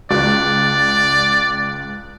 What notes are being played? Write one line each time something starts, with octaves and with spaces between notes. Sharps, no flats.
C#2 D5